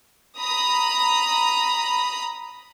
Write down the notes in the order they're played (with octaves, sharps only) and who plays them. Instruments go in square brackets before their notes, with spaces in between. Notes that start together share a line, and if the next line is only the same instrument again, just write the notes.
[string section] A#5 B5 D#6